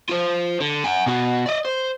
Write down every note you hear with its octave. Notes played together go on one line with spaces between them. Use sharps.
F4 C5
D3
F#5 G#5
B2 F#4
D5 D#5
C5